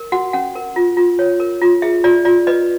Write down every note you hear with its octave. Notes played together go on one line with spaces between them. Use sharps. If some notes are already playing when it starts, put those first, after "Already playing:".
Already playing: A#4
F#4 F#5
C#4 F#5
A#4
F4
F4
C#5
A#4
F4
G#4 E5
F4 D5
F4 D5
B4 D#5